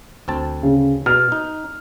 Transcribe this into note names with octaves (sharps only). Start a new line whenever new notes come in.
D2 C4 A5
C#3
B2 F6
D#4